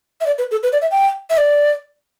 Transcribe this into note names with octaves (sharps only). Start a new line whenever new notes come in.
E5
D5
B4
A4
B4
D5
E5
G5
E5
D5